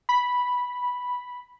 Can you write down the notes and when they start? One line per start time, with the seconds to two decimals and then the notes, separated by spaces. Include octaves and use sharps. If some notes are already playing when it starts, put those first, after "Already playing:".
0.09 B5